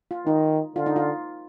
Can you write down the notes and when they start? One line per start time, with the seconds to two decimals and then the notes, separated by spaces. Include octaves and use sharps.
0.11 F4
0.26 D#3 D#4
0.76 D3 F4
0.86 D#4
0.96 F4